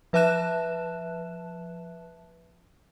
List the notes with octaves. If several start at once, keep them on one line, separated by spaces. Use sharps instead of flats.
F3 B4 E5 A5 F#6 E7